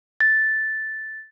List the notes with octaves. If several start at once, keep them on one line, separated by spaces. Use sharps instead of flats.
A6